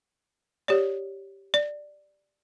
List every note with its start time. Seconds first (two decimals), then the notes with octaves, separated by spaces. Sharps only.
0.68 G4 C#5 D5
1.54 D5